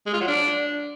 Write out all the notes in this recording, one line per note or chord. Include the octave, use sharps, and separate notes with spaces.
G#3
F4
F#3
D4